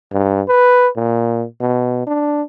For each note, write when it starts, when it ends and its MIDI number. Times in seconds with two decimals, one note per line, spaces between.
0.12 0.42 43
0.48 0.88 71
0.96 1.45 46
1.61 2.04 47
2.07 2.42 62